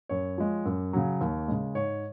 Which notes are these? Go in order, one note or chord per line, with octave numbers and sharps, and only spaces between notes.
F#2 C#5
F3 G#3
F#2
C#3 F#3
D#2
C#3 G#3
G#2 C#5